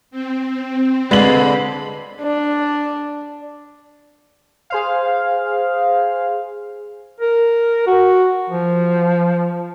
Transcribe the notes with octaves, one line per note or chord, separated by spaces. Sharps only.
C4
D3 G#3 B4 D5 D#5 B5 F#7
D4
G#4 C5 F5
A#4
F#4
F3